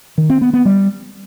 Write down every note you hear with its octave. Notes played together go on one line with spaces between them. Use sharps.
D#3
C4
B3
B3
G3